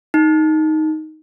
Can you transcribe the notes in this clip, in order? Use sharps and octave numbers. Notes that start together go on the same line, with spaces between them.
D#4